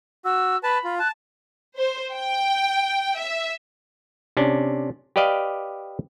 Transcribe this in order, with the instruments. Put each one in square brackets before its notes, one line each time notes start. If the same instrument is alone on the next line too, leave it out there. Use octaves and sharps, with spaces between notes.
[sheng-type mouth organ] F#4 [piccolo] E6
[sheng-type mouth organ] B4 A5 [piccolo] B5
[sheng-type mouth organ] F4
[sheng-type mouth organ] A5 [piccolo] F#6
[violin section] C5
G5
E5
[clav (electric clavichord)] C3 C#4 D4
G4 B4 D5 D#5 F5